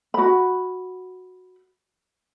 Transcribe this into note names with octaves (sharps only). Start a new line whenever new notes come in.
F#4 B5